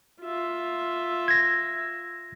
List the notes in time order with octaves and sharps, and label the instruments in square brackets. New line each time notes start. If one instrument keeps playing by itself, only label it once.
[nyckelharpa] F4 E5
[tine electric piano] G#6 A#6